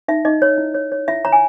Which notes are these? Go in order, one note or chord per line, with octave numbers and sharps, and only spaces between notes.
D#4 E5
D#4 D#5
C#5
E4
C#5
C#5
E4 E5
C#5 A#5
G#5